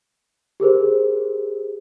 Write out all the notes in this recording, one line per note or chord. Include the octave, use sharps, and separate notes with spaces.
G4 G#4 A#4 C5